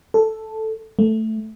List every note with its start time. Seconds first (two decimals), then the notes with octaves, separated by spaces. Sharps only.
0.14 A4
0.99 A3